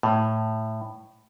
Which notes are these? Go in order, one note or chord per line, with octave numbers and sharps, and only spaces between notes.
A2